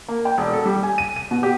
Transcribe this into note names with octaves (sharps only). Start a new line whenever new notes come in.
A#3
G5
E1
A4
G3
G#5
D#7
D#7
B2
G4